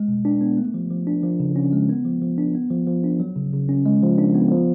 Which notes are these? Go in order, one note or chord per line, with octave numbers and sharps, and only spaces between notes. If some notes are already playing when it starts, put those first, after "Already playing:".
Already playing: G#3
B2
D4
B3
A3
F3
F3
D4
F3
C#3
C#4
G#3
B3
F3
F3
D4
B3
F3
F3
D4
F#3
C#3
C#3
C#4
G#3
F3
D4
B3
F3